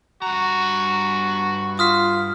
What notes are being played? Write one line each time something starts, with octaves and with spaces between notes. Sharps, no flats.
G2 F#4 A#5
F4 D#6 F6 B6